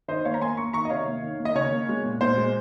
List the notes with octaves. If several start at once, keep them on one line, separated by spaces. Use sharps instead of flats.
D#3 C5 D#5
A#3 C#5 F5
A#5
A#3 G#5 C6
A#3 A#5 C#6
D#3 A#5 C#6
D#5
C3 C#5 F5
A#3
D#3
A#3
D#5
C#3 C#5
A#3
G#3
A#2
A#2 C5
G#3